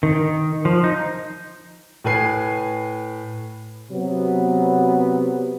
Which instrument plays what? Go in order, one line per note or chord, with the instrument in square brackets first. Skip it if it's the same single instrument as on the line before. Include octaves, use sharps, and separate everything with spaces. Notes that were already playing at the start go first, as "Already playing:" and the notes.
[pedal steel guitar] D#3
F3
D#4
[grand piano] A2 B4 G#5 C7
[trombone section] C3 F#3 B3